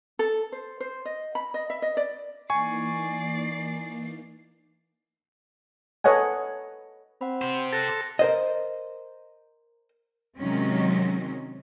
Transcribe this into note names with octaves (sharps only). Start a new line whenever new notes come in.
A4
C5
C5
D#5
B5
D#5
E5
D#5
D5
E3 A#3 D#4 D5 G#5 C#6 C7
A4 B4 C#5 D#5 F#5 G#5
C4 F#5 B5
G4 C5 G6
A4 F#6 A#6
A#4 C5 D#5
C3 D#3 F#3 G#3 C4 C#4